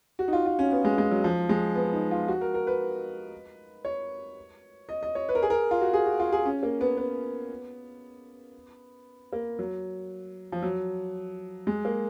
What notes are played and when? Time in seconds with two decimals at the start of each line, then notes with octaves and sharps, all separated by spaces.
0.19 F#4
0.28 D#4
0.33 F4
0.46 F4
0.59 C#4
0.72 B3
0.85 G#3
0.98 G#3
1.11 F#3
1.24 F3
1.49 G#3
1.75 B3
1.93 D#4
2.11 F4
2.28 F#4
2.41 A#4
2.54 A#4
2.67 B4
3.85 C#5
4.89 D#5
5.03 D#5
5.15 C#5
5.29 B4
5.35 A#4
5.43 G#4
5.50 A#4
5.71 F4
5.81 F#4
5.93 G#4
6.06 F#4
6.20 F4
6.32 G#4
6.45 C#4
6.63 A#3
6.81 B3
6.97 B3
9.33 A#3
9.59 F#3
10.52 F3
10.63 F#3
11.67 G#3
11.85 A#3